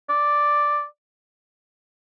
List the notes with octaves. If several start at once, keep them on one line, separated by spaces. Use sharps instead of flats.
D5